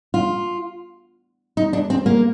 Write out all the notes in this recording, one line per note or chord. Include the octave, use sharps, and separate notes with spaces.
F4
D#4
D4
C4
A#3